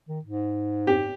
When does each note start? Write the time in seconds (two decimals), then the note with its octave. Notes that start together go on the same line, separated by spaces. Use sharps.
0.09 D#3
0.24 G#2
0.87 G4